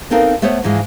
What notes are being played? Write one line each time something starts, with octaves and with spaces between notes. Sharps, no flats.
B3 C4 D#4 A4 A#4 F5
A3 B3 C5 C#5 F#5
G#2 E3 F3 G#3